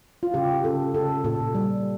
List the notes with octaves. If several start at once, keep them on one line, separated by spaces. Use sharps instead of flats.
F4
C#3 G4
C#3 A4
C#3 A4
A#2 A4
G3